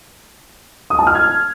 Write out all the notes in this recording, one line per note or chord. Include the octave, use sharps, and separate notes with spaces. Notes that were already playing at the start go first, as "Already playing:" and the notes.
D#6
A5
F6
G#6